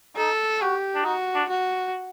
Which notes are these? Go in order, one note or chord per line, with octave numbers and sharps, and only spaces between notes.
D#4 A4
F#4 G4
D4
D#4 F#4
D4
F#4